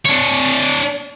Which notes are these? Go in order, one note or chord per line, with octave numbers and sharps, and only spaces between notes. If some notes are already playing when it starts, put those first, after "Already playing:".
D4 C#5